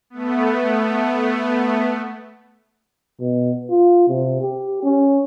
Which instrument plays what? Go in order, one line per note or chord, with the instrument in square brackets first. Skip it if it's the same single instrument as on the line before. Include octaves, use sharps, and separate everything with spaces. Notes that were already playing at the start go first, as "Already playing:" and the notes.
[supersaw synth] A3 B3
[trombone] B2
F4
C3
G4
C#4